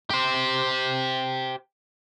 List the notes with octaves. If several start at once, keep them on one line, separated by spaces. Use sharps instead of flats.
G4 C5